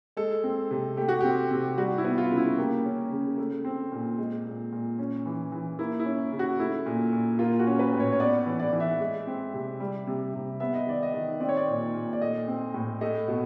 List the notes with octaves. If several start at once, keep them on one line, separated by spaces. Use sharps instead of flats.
G#3 A4
C4
C3
A3 G4
F#4
C4 G4
C3
G3 F#4
E4
B3
F4
C#3
E4
A#3 G4
C#4
C#3
A3
C4
A#2
G#3
A#2
A#2
C#4
E3
E3
A#3 E4
E4
C#4
C#3
F#4
A3 E4
A#2
A#2
A#3 F4
F#4
C#4
B4
A2
C#5
C#5
B3 D5
E3
D5
E3
E5
G#3
C4
C3
G3
C3
C3
B3 E5
D#5
D#3 D5
D#5
D#3
C4 D5
C#5
D5
A#2
A#2
D5
A3 D#5
C4
A2
A3 D#5
B2